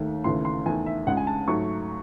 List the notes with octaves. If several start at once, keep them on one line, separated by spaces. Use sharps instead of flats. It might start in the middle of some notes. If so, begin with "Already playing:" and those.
Already playing: D#2 D#3 A3
D#2 C#3 E3 A3 C6
C6
E2 D#3 A3 G#5
E5
C#2 C#3 G#3 F#5
G#5
A5
G#2 F#3 A3 C#6